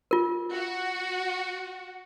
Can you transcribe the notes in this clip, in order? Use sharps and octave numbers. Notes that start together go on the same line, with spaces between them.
F4 A#4
F#4